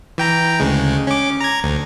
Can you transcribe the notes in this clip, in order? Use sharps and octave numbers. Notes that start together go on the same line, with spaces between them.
E3 G5 A#5
D2 C#3 G#3
C#4 D6
A#5 G#6
D2